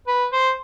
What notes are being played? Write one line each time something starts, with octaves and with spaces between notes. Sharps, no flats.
B4
C5